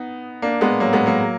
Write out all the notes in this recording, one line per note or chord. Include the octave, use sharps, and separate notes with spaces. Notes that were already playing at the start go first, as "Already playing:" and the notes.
Already playing: B3 D#4
A#3 D4
G#3 B3
F#3 A#3
G#3 B3
F#3 A#3